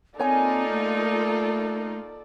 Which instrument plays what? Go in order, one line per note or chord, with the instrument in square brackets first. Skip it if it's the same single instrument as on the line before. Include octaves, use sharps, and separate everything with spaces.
[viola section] A#3 D#4 F4 [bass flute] C4 [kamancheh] A4 D5 [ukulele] C#5 G#5
[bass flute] A3